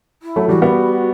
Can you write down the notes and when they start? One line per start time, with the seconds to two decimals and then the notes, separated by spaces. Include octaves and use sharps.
0.23 E4
0.36 F#3 A3
0.48 E3 G3 F#4
0.62 G3 B3